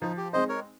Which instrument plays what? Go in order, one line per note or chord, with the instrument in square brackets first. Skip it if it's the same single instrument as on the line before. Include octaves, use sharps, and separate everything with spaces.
[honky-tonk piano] F3 [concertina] D#4
[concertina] G4
[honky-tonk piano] G#3 C4 D#4 [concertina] C5 D#5
[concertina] A#4 C#5